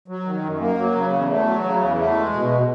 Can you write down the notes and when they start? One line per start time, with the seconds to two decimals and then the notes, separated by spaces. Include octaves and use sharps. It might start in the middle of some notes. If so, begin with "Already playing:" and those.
0.08 F#3
0.25 D#3
0.43 F#2
0.61 A#3
0.78 F#3
0.95 C#3
1.13 E2
1.30 A3
1.46 F#3
1.64 C#3
1.82 E2
1.99 A3
2.16 G#3
2.33 B2